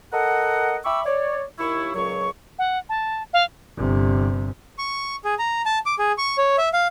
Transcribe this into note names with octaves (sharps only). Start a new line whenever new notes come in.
A4 A#4 D#5 F#5
E5 G5 B5 C#6 D6 E6
C#5 D5
D#2 E4 C#6
C#2 A#2 F#3 C#5 C#6
F#5
A5
F5
G1 C3
C#6
G#4
A#5
A5
D6
G#4
C#6
C#5
E5
F5